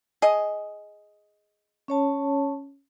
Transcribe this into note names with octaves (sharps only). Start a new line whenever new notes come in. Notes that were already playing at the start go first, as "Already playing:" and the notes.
G#4 D#5
C#4 C#5 A5